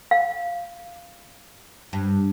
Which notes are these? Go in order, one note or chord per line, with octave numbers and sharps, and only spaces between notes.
F5
G2